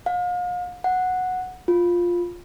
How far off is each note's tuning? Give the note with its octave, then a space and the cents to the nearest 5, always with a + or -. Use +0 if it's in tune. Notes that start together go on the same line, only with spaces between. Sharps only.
F5 +40
F#5 -10
F4 +5